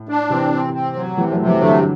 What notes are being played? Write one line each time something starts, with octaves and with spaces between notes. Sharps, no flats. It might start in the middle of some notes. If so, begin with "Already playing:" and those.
Already playing: A2
D4
C3 E3 C4
C4
C4
F#3
C3 E3 G3
F#3 A3
C3
E3 G3
D3 F#3 A3